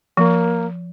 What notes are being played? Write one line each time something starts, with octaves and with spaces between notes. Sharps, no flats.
F3 A#3